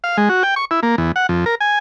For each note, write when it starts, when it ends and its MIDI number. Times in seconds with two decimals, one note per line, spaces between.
0.04 0.17 77
0.17 0.29 56
0.29 0.43 66
0.43 0.55 79
0.56 0.65 85
0.71 0.80 64
0.83 0.96 58
0.98 1.12 40
1.16 1.27 78
1.29 1.45 41
1.46 1.55 70
1.61 1.79 80